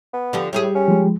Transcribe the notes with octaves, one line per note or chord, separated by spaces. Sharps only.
B3
D3 F3 G4
A2 G3 G4 G#4
C#4
F3 G#3